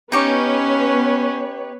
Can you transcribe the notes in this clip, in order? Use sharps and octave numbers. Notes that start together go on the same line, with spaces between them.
B3 C#4 D#4 G4 B4 C#5 C#6